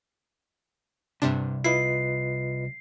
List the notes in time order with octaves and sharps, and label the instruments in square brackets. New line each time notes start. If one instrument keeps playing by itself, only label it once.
[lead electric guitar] C2 [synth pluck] G2 C3 D4
[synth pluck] E4 [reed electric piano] F4 B4 D#5 [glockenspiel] C7